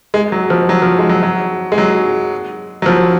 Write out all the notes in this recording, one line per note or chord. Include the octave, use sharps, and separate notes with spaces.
G#3
F#3
F3
F#3
F3
G#3
F#3
F#3
G#3
F#3
F#3
F3